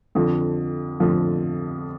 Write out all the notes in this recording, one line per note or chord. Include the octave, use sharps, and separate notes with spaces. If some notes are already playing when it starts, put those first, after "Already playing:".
F2 D3 F3
F2 D3 F3